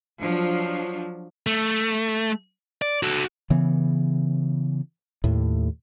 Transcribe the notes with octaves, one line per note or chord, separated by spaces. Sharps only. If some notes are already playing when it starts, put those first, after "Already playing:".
F3 F#3 D4
A3
D5
F#4 A4
C#3 E3 B3
D#2 A2